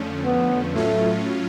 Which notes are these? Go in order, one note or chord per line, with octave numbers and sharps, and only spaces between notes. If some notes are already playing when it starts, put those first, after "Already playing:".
Already playing: F2 D3 F3 A3 C#4
B3
A2 F#3 A3 C#4 F4